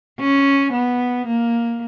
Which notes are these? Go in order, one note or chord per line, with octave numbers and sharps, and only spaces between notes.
C#4
B3
A#3